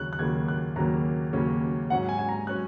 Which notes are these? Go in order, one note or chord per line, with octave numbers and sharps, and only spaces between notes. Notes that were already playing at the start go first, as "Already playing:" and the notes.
Already playing: D#2 C#3 F#3 A#3 C#4 F#6
F#6
D#2 C#3 F#3 A#3 C#4 G#6
F#6
D#2 C#3 F#3 A#3 C#4 A#5
D#2 C#3 F#3 A#3 C#4
G#2 F#3 C#4 F#5
G#5
G#5
A#5
F#3 C#4 F#6